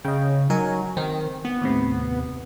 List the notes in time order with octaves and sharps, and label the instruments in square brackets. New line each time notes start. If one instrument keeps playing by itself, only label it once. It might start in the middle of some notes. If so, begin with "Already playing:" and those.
[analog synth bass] C#3 [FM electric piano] D#5 G5
[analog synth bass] F#3 [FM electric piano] D#4 A#4 G#5
[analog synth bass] D#3 [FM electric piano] C4
[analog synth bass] B3
[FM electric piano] D#2 A2 C3